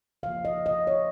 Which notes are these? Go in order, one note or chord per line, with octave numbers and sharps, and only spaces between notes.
C#3 F3 A#3 F5
D#5
D#5
C#5